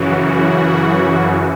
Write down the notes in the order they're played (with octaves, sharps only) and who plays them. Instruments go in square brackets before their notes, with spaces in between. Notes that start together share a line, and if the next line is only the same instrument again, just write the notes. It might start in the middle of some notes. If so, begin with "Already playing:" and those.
Already playing: [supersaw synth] F#2 C#3 E3 F#4